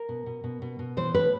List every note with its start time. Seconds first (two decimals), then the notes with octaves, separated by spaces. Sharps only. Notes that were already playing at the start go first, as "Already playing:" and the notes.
Already playing: A#4
0.09 B2
0.26 B2
0.44 B2
0.62 B2
0.79 B2
0.97 E3 C5
1.14 A2 B4